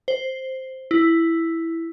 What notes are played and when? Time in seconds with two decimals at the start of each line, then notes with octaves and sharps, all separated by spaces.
0.08 C5
0.91 E4